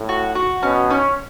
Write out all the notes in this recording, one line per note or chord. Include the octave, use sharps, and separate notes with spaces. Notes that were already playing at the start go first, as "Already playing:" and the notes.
Already playing: A2
F#4
F#4
B2 C#4
C#4